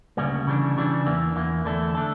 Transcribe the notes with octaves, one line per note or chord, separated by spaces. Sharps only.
D2 C#3 G3 A#3
C#3 E3 G3 D4
C#3 E3 G3 D4
E2 E3 A#3
E2 E3 A#3
E2 D3 A3 D4 A4
D3 A3 D4 A4